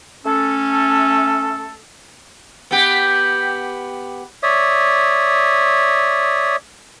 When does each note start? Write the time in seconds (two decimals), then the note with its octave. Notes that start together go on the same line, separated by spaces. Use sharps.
0.25 A3 C#4 A4
2.71 B3 G4
4.43 C#5 D5 E5 D#6